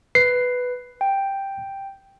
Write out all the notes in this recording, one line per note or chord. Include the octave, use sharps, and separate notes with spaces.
B4 C7
G5